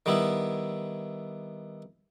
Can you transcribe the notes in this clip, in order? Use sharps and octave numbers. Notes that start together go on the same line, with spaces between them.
D#3 G3 B3 E4